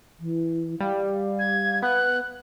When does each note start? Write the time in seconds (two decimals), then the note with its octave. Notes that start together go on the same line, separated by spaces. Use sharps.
0.20 E3
0.80 G3 F5
1.13 F5
1.39 G#6
1.82 B3 F#6